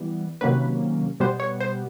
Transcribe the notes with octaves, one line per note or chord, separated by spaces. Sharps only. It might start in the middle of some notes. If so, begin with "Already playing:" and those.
Already playing: E3 G3 B3
C3 D#3 F#3 A#3 C#4 B4
B2 G3 B3 C5
C#5
C5